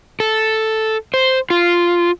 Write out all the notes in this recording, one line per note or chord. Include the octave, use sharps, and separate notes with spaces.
A4
C5
F4